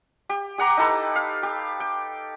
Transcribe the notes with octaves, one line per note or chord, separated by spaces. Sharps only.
G4
G4 F#5 A#5 D6
D#4 E4 A4 B4
F5
G4
G5